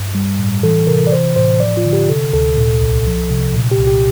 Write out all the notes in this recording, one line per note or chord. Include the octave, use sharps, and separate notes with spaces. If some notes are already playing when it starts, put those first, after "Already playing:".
Already playing: G2
G3
A2
E3 A4
C3 A#4
D5
E3 C5
A2 C5
F3 D5
F4
D3
G4
C3 A4
D2 A4
A#2
C2
F3
C3
A#2
G4
C2
G4